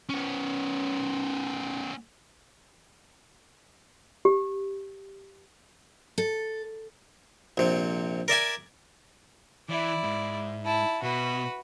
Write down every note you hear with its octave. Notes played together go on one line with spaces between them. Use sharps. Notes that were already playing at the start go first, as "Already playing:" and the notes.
B3 C#4
G4
A4
A#1 C3
A#4 D5 E5 G#5
E3 E4 D5
G#2
E4 A5
B2 F#4 B4